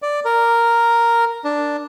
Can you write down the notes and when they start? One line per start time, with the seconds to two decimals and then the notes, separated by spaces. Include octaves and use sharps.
0.02 D5
0.25 A#4
1.44 D4